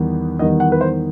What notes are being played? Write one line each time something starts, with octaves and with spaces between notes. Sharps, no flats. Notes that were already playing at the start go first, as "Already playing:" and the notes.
Already playing: E2 D#3 G3 B3
E2 D#3 G3 B3 D#5
F#5
B4
C5